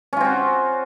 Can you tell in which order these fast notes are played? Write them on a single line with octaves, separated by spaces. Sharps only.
C#4 F4 C4 F#4